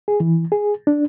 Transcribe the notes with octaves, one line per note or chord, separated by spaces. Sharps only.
G#4
E3
G#4
D4